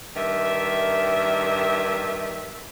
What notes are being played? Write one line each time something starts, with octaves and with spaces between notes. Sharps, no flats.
G2 D#3 A#4 E5